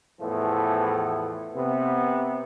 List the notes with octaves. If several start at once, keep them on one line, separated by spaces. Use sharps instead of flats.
E2 A2 E3 F3 A3 B3
C3 B3